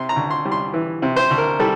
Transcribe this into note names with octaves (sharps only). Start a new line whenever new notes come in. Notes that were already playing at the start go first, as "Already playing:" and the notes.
Already playing: C3 C6
A#5
D2
C6
G3
C6
E3
C3
C5
D2
A#4
G3 A4